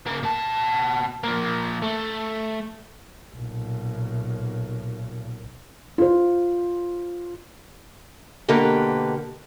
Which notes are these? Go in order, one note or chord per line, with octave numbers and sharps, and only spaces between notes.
C#3 A#3
B2 A5
F3 A#3
A3
B1 A#2
F4 C5
B2 D3 A#3 G4 A#4 B4